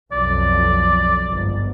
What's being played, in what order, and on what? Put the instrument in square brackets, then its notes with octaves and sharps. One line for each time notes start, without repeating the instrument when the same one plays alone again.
[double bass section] B1 F2 [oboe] D5
[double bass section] G1 G#2